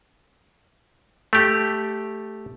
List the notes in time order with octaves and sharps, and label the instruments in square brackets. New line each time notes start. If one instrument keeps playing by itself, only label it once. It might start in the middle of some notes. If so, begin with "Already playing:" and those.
[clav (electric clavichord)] A3 G4